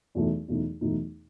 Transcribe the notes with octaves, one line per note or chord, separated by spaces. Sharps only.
E2 B2 F#3 A3 D#4
E2 B2 F#3 A3 D#4
E2 B2 F#3 A3 D#4